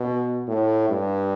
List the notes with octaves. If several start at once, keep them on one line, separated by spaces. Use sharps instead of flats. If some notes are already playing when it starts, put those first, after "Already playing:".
Already playing: B2
A2
G2